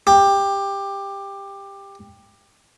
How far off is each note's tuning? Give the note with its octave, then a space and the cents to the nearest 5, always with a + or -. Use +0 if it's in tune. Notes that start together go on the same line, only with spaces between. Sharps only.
G4 +15